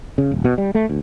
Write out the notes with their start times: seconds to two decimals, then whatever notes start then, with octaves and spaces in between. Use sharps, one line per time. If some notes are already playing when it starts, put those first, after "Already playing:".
0.18 C#3
0.31 D#1
0.44 B2
0.58 G3
0.75 A3
0.90 D2